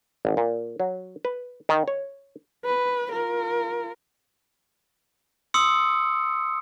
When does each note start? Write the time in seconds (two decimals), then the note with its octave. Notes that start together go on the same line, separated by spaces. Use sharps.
0.25 G#1
0.37 A#2
0.80 F#3
1.25 B4
1.69 D#3
1.88 C#5
2.65 B4
3.12 F4 A#4
5.54 C6 D#6 E6 C#7